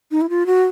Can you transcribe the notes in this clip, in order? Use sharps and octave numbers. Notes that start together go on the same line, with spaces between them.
D#4
E4
F4
F#4